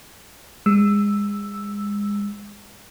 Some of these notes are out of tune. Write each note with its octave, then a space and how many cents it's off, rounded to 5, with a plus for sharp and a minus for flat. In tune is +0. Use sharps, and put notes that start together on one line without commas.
G#3 -25 E6 +0